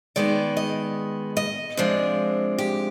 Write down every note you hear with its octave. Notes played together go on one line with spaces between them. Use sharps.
D#3 G#3 B3 D5
D#5
D#5
C3 F3 G#3 D4
G4